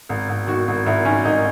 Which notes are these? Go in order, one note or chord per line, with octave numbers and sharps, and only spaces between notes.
G#1
G#1
D#3 F#4
G#1
G#1 E4
D#3 C#4
G#1 D#4